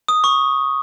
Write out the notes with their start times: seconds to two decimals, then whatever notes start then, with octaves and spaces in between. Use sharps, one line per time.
0.08 D#6
0.24 C#6